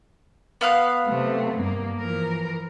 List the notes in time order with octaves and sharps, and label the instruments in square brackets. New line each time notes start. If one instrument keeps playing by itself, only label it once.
[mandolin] B3 F5 F#6
[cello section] C3 F#3 A3
G2 A#3
E3 F3 A#4